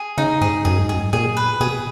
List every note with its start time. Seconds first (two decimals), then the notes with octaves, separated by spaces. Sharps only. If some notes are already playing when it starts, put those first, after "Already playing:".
Already playing: G#4
0.18 C#3 D#4
0.41 G#2 G#4
0.65 F#2 G#4
0.78 G#2
0.89 F#2 G#4
1.13 A#2 G#4
1.37 B4
1.60 B2 G#4